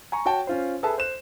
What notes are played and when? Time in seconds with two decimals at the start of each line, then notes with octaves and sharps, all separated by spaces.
0.12 G#5 A#5 C#6
0.26 F#4 C#5 G5 A5
0.47 C#4 F4 C5
0.83 G#4 A4 B4 E5 A5
0.98 C5 F#6 E7